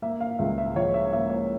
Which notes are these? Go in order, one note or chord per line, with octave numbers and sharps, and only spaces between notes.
A#3 E5
F5
C#2 E5
E5
F3 C#5
E5
A#3 E5
C#5